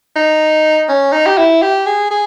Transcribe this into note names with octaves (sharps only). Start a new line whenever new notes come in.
D#4
C#4
D#4
G4
E4
G4
G#4
G#4